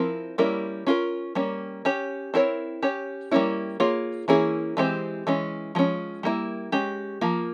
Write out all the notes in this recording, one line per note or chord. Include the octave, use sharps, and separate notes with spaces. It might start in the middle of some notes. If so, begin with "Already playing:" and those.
Already playing: F3 C4 E4 A#4
G3 A#3 C#4 E4 A#4
C#4 F4 A#4
G3 A#3 C#4
C#4 G4 C#5
C4 E4 A#4 C#5
C#4 G4 C#5
G3 A#3 C#4 E4
A#3 F4 G#4 C#5
E3 A#3 C#4 E4 G#4
E3 G#3 C4 G4 C5
E3 G#3 C#4
F3 G#3 C#4
G3 A#3 E4
G#3 C#4 G4
F3 A#3 F4